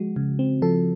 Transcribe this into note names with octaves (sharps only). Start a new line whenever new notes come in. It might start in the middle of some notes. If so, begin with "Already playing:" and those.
Already playing: F3 G#3 F#4
C#3
C4
F3 A4